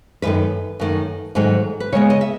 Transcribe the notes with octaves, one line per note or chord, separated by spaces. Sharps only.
F#2 D#3 A3 B4
F#2 D#3 A3
G#2 D#3 F#3 A3
B4
C#3 G#3 B3 C#5
D#5
E5